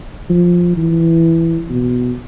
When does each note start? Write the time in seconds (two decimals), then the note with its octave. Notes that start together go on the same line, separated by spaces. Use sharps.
0.30 F3
0.77 E3
1.70 B2